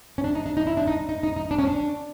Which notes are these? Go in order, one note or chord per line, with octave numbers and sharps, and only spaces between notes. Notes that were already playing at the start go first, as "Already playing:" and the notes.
C#4
D4
D#4
D4
D#4
E4
D4
D#4
D#4
D#4
D#4
D4
C#4
D4